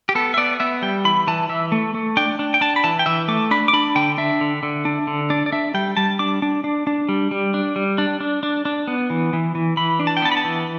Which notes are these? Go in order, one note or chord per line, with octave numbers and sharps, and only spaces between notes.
G4
B3 A4
E5
B3 D5
B3 E5
G3 G5
E3 B5
E3 A5
E3 E5
A3
A3
D4 G5
D4
G5
D4 A5
B5
E3 A5
G5
E3 E5
A3 D6
D4 B5
D6
D4 B5
D3 G5
D4 E5
D3
D3
D4
D3
D4 D5
D5
D4 E5
G3 G5
G3 A5
D4 D6
D4
D4
D4
G3
G3
D4
G3
D4
D4
D4
D4
B3
E3
E3
E3
E3 B5
D4
A5
G5
B3 A5
B5
A5
E3